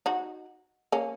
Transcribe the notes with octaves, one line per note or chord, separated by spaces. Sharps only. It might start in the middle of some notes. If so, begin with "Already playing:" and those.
D#4 F#4
A#3 C#4